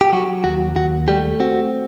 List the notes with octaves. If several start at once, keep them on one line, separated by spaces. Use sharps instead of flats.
G4
F#3 F#4
D#2 F#4
D#2 F#4
G3 A3 G4
C4 F#4